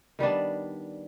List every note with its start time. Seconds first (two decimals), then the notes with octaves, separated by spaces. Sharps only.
0.19 D#3 G3 B3 D4